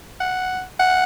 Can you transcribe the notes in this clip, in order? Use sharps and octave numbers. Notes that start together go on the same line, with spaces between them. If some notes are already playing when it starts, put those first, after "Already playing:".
F#5
F#5